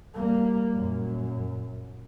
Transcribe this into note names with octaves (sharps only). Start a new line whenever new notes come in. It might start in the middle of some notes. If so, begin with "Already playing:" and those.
G3 A#3
F#2 A#2